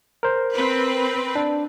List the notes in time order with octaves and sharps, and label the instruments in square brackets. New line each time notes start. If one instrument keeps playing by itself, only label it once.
[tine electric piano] A#4 C5
[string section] C4 B4
[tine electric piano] D4